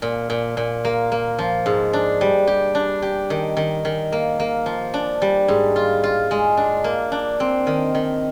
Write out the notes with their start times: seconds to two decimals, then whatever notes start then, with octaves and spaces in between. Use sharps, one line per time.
0.02 A#2
0.30 A#2
0.57 A#2
0.85 A#3
1.12 A#3
1.39 F3
1.66 G#2
1.93 D4
2.21 G3
2.47 G4
2.75 D4
3.02 G4
3.30 D#3
3.57 D#3
3.85 D#3
4.12 A#3
4.40 A#3
4.66 F3
4.94 D4
5.22 G3
5.48 G#2
5.76 F4
6.04 F4
6.31 G#3
6.57 D4
6.84 A#3
7.12 D4
7.40 C4
7.67 D#3
7.95 D#3